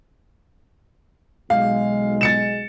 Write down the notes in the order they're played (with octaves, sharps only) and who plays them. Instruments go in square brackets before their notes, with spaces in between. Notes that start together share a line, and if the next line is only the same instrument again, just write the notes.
[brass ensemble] B1 G#3 [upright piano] F5
[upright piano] A6 C#7 E7